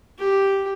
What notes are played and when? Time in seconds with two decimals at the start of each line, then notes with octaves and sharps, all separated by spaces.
0.19 G4